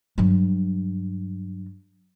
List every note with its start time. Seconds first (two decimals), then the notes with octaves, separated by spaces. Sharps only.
0.18 G2 F#3